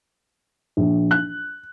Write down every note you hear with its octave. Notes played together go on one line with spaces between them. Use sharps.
A#1
F#6